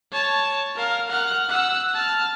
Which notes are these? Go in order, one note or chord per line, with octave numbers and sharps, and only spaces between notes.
C#5 A5
A#4 F5
F#5 F6
F#5 E6
A5 F6